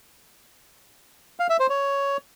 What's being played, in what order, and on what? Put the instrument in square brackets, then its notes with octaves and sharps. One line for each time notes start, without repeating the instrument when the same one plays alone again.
[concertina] F5
E5
C5
C#5